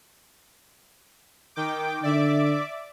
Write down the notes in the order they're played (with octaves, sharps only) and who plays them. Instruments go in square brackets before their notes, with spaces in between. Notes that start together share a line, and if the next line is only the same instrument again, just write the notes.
[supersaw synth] D#3 G5 D6
[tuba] D3 [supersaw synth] D5 E5 D6